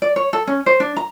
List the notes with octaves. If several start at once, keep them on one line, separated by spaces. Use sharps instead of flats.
D5
C#5
A4
C#4
C5
D4
A#5